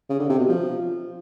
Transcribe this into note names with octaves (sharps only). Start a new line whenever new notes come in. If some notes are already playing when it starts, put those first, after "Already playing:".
C#3
D3
C3
B2
F3